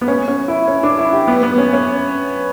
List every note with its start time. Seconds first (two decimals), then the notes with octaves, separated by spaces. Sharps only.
0.01 B3
0.08 C#4
0.28 C#4
0.48 E4
0.68 C#4
0.83 D4
0.98 E4
1.13 G4
1.27 B3
1.43 B3
1.58 C#4
1.73 C#4